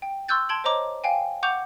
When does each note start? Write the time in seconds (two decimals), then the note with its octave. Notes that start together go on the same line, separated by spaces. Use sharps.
0.02 G5
0.28 C6 C#6 E6 F#6 G6 A6
0.49 A5 C6 G#6 D7 F#7
0.64 C5 C#5 D#5 A#5 D6
1.04 F5 G5 G#5
1.43 F#5 C#6 D6 G6 F7